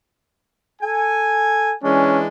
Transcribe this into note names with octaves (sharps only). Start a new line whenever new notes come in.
A4 G#5
E3 G#3 C#4 D4